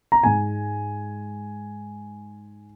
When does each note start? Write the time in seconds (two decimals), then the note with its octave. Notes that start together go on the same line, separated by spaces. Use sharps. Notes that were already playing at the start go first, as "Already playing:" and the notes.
0.12 A#5
0.23 G#2 G#3 G#5